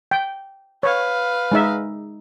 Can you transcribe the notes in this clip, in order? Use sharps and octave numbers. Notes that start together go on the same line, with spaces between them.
G5
B4 C#5 F5
G#3 D#4 E5